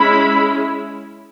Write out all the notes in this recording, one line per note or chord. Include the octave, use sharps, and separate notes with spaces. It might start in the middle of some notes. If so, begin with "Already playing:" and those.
Already playing: G#3 C#4 E4 B5